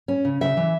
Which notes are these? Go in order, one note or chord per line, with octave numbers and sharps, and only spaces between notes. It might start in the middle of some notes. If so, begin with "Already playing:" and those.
C#4
C#3
C#3 E5
E3